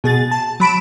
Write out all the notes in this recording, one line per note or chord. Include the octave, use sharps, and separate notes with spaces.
B2 G#4 A6
A5
F#3 B5 D7 E7